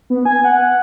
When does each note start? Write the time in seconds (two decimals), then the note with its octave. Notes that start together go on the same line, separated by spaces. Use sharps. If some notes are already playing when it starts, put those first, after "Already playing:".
0.10 B3
0.25 G#5
0.44 F#5